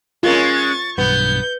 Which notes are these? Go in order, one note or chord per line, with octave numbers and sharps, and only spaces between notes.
G#3 C#4 F4 A#4 C#6 A6
B1 G2 B3 G6